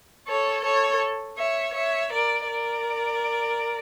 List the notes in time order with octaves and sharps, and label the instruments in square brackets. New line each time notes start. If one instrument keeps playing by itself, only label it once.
[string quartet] A4 C#5
A4 C#5
C#5 E5
C#5 E5
A#4 D5
A#4 D5